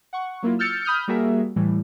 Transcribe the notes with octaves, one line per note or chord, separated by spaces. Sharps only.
F#5 C#6
F#3 A#3 E4 F4
E6 F6 G6 A6 C#7
B5 D#6 F6 G6
G3 A#3 F#4 G#4 A#4 E5
A2 E3 G3